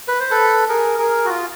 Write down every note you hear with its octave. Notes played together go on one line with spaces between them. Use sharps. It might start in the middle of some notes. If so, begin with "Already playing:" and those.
B4
C5
A4 B4
G#4 A#4
G#4 A#4
F#4
F4